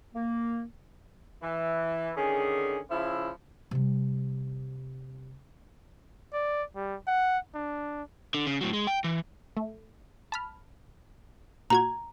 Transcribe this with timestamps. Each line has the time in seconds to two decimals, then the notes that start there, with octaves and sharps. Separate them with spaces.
0.14 A#3
1.43 E3
2.18 D3 D#3 C#4 G#4
2.91 C#3 F3 E4
3.71 C3 G3
6.33 D5
6.76 G3
7.07 F#5
7.55 D4
8.34 D3
8.46 C#3
8.61 A2 F#3
8.73 G#3
8.87 G5
9.04 E3
9.57 A3
10.32 A5 B5 F6
11.70 A#2 F#4 A#5 G#6